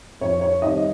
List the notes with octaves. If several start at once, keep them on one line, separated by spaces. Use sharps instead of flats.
F2 C#5
C#5
D#3 G3 C4 D#5